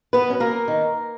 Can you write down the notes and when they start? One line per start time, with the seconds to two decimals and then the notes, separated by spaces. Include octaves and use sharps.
0.13 B3 B4
0.27 F#3 C#4
0.40 A#3 A#4
0.68 D#3